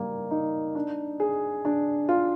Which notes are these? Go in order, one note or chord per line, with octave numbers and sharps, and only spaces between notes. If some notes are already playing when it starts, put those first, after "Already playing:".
Already playing: G3 A#3
D#4
D4
G#4
D4
F4